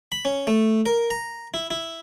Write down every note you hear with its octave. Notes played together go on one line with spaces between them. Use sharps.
B5
C#4
A3
A#4
A#5
E4
E4